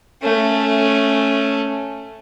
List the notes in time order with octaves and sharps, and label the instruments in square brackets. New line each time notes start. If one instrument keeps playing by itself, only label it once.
[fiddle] A3 C#4